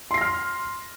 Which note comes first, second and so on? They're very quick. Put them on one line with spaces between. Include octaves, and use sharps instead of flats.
C6 C7 A#6 F6